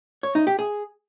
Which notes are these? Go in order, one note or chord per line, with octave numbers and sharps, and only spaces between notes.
C#5
D#4
G4
G#4